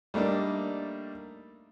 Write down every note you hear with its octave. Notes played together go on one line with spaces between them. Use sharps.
G3 A3 A#3 D4 D#4